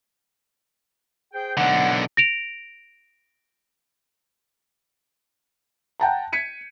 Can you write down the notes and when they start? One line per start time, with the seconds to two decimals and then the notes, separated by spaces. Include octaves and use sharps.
1.33 G#4 C5 G5
1.57 B1 D3 F#5
2.17 A#6 D7 F7
6.00 F#5 G5 A5 A#5
6.33 G#6 B6 C#7 D#7